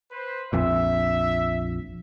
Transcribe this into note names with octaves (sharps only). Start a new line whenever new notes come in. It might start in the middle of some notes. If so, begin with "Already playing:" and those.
B4 C5
A#1 F2 A#2 E5